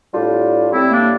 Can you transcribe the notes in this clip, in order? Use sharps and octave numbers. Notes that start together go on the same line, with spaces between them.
A2 G3 D4 F4
A2 G3 C4 E4
A#3 D4